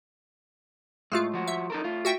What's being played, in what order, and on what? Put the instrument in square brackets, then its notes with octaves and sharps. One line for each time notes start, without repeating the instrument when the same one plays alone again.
[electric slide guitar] A2 [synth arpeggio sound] G#3 A3 F4
[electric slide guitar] F3 F#4
[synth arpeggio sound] E5
[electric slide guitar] D#4 A4 A#4
A3 F4
[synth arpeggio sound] F#4 E5 G5